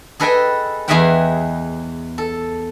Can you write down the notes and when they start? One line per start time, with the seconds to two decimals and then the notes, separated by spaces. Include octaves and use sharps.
0.20 G#4 A4 B4 D#5 G5 G#5
0.88 E2 G#4 D#5 E5 F#5 G5
2.18 A4